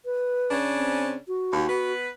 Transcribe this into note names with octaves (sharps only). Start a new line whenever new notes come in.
B4
C#3 C#4 D4
C4
F#4
D#2
B3 B4